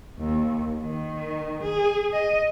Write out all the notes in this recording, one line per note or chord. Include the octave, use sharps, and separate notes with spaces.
D#2
D#3
G#4
D#5